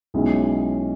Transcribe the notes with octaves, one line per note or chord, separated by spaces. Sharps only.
B1 B2 G#3 C#4 E4